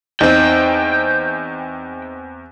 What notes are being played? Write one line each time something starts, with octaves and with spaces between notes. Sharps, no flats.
E2 C4 D#4 C5 G5